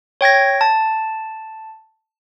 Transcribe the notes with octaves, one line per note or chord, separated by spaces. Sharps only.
C#5 G5 G#6 A#6
A5